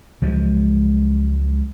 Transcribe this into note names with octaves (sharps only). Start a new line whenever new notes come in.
C#2 F3 F#3 G#3